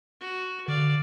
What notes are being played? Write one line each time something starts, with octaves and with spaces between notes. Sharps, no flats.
F#4
D3 D5 F5